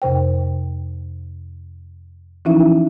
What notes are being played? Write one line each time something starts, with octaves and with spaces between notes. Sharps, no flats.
F2 C3 C5 G5
E3 F3 C#4 D#4 E4 E5